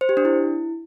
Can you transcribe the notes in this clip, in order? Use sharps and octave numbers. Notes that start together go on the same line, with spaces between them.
C5
G4
D4
E4